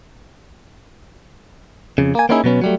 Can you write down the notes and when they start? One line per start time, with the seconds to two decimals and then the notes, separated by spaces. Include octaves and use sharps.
1.98 F2 C#3
2.15 A#3 G#5
2.29 A#3 B3 C#4 D#4 E4 G#4
2.44 B2 F#3 B3 C#4
2.61 F#3 G3 A3